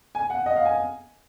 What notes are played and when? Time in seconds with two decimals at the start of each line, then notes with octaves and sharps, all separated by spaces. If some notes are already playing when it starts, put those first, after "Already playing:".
0.15 G#5
0.30 F#5
0.46 D#5
0.56 F5
0.65 G#5